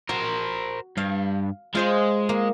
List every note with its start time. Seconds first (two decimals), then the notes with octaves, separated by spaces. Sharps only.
0.09 F#4 A#4 C5
0.97 G2 F5
1.75 G#3 F4 C5 D#5
2.29 A#3